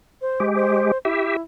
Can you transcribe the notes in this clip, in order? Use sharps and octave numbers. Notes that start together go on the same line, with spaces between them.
C5
G#3 G4
C5
E4 G4 E5